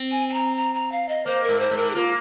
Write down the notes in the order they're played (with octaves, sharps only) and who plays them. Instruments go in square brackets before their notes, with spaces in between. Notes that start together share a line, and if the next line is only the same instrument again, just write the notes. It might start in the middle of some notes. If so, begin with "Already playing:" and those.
Already playing: [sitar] C4
[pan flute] G#5
G#5
A#5
A#5
A#5
F5
D#5
[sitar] A#3 [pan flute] C5
[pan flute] A#4
[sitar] G#2
[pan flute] C5
[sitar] G#2
[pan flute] A#4
G#4
[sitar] A#3 [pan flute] F4